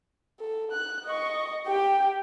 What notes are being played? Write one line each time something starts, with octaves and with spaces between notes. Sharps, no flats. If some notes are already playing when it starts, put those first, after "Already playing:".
A4
F#6
D#5 C#6
G4 G5